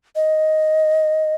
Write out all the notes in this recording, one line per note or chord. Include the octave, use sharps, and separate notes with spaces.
D#5